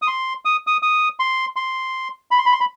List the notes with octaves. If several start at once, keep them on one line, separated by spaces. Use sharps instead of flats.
D#6
C6
D#6
D#6
D#6
C6
C6
B5
C6
B5
C6
B5